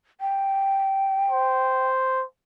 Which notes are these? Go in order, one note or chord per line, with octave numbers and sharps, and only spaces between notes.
G5
C5